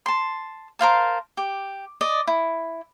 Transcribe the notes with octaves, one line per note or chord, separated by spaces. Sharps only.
A5 C6
A#4 C5 F5 A5
G4
D5 D#5
E4